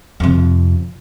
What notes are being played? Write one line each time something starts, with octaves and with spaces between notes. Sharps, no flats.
F2 C3